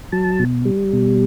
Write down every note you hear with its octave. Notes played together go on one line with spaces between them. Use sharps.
F#3 A5
B2
G3
B2